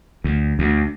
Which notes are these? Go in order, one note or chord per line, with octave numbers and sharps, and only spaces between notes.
D2
D2